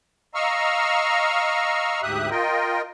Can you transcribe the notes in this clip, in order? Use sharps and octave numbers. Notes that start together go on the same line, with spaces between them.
D#5 F5 A#5 C#6 E6 F6
D2 G#2 G4 E5 D#6 F#6
F4 A#4 D#5 G5